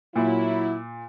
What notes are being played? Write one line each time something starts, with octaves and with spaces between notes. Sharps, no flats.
A#2 F#3 E4